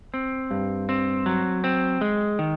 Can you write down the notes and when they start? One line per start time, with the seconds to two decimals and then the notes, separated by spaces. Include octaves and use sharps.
0.14 C4
0.51 G2
0.89 C4
1.26 F#3
1.64 C4
2.01 G#3
2.39 D#3